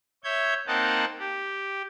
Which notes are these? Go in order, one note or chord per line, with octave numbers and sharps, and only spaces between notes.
C#5 E5 G6 G#6
A#3 C4 D#4 D#5 F#5 A5
G4